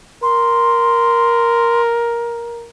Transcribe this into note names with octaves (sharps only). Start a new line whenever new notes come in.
A#4 C6